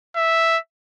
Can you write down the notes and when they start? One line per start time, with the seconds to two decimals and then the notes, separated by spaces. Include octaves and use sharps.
0.16 E5